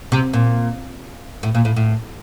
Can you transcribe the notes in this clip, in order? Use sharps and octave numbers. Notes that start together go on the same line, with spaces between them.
C3
A#2
A2
A#2
A2
A2